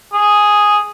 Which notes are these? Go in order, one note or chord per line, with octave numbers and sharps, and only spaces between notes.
G#4